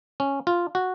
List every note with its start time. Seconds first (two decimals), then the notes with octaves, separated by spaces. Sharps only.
0.20 C#4
0.47 F4
0.75 F#4